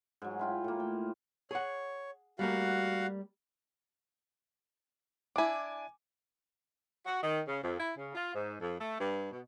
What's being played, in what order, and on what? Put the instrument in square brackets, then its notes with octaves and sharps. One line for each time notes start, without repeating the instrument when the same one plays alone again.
[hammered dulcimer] G#2 F#3
E4 F4 G5
A2 A#3
G5
[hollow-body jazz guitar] G#4 F#5 [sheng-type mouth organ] C#5
[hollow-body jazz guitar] G3 A3 A#3 [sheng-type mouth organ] F#4 F5 F#5
[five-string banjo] D4 E4 [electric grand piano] G#5 D6
[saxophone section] F#4
D#3
C#3
F2
E4
C#3
F4
G#2
F2
A3
G2
B2